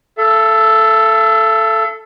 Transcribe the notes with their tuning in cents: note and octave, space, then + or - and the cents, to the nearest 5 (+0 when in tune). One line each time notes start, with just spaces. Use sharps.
A4 +0 E5 +45